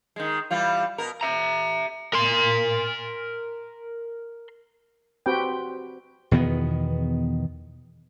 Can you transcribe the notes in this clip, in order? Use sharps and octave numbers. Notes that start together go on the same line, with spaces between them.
D#3 G#3
E3 G3 F4
B2 A#4
E5 A#5
A#4 C6
C4 F#4 G4 B4 G5
E2 B2 D#3 B3